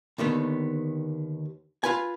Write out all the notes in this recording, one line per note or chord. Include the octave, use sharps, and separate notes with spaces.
D#2 D3 D#3 B3
F4 B4 G#5